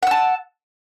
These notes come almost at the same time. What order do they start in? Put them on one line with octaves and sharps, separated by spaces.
F#5 E6 A5